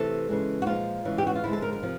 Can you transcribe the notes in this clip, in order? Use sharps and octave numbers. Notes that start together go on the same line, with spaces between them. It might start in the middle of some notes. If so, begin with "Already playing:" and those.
Already playing: C3 E3 A3 A4
C#3 E3 G#3
F#4
A#2 F3 G#3 F4
C#3 E3 G#3
G4
F#4
F4
D3 F3 G#3 E4
A4
A#4
A#4
C3 F3